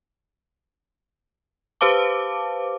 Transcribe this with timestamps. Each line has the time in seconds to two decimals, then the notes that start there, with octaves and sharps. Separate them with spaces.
1.81 G4 B4 C5 F5 A5 D6